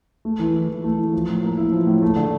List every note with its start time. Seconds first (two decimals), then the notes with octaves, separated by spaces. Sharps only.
0.25 A3
0.39 E3
0.54 E4
0.69 E3
0.84 A3
0.98 E3
1.13 F3
1.29 A2
1.43 A#3
1.57 E4
1.72 F3
1.87 A2
2.02 A3
2.16 D3